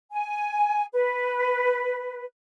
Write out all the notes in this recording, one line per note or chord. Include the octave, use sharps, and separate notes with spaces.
G#5
B4